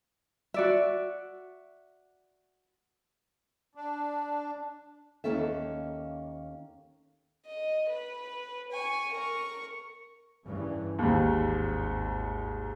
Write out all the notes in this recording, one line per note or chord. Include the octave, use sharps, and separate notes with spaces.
F#4 D5 E5
D4
D#2 C3 A#3 C#4 A4 E5
D#5
B4
G#5 C#6
A#4 C#6
G2 C#3 E3
G#1 D#2 G#2